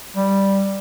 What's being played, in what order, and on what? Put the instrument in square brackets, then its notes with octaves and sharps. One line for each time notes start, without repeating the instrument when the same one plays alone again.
[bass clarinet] G3